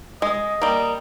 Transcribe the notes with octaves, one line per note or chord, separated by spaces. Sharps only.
G#3 D#5
G3 A#3